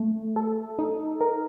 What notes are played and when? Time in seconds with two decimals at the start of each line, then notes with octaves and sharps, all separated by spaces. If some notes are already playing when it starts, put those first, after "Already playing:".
Already playing: A3
0.36 A4
0.79 D#4
1.21 A#4